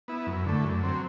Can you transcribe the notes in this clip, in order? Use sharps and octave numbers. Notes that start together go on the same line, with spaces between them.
B3 E4
F#2
D3 A3
F#2
F#3 C4